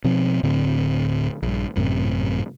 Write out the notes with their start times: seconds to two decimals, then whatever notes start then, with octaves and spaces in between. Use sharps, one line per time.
0.04 B2 F3 C4
0.43 D1 A2 D3 C4
1.42 A#1 G2
1.76 G#1 F#2 A2 C3